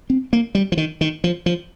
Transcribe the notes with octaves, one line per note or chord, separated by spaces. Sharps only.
C4
A#3
G3
F3
D#3
D#3
F3
F3